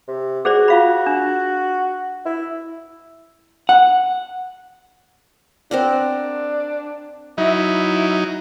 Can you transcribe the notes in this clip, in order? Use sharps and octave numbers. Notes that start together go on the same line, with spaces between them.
C3
F#4 G#4 C5 D5
F4 F5 B5
D4
E4
F#5
C4 D4 A#4 F#5
F#3 D#4 E4